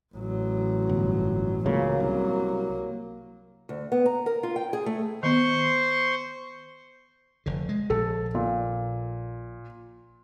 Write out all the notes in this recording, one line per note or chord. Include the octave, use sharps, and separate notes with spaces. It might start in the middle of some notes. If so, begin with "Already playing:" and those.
A1 F#3
G1
C#2 C#3 F#3 A#3
C2
D2
B3
A#5
A#4
F4
G5
G#4
A3
D#3 B3 C5 C6 C#6
F1 D3
G#3
A#1 A4
A#2